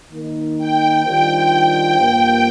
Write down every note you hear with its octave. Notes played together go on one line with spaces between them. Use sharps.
D#3 A#3 D#4
G5
D#3 G3 D4 F4 C5 G5
G5
G5
G2 F3 A#3